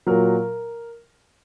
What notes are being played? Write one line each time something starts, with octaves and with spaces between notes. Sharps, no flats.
A#2 F#3 A#4